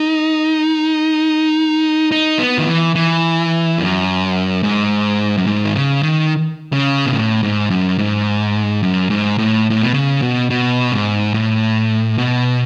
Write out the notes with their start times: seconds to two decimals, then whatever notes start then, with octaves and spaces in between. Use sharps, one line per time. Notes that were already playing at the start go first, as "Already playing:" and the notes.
Already playing: D#4
2.12 D#4
2.39 B3
2.58 D#3
2.67 E3
2.95 E3
3.79 F#2
4.63 G#2
5.37 F#2
5.47 G#2
5.64 D#3
5.75 C#3
6.03 D#3
6.73 C#3
7.06 B2
7.14 A2
7.43 G#2
7.70 F#2
7.99 G#2
8.83 F#2
9.10 G#2
9.38 A2
9.70 A2
9.82 B2
9.94 C#3
10.22 B2
10.50 B2
10.92 G#2
11.34 A2
12.18 B2